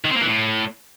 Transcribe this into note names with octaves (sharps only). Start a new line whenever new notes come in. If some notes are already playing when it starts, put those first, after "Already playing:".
D#3
C4
A#3
E3
A2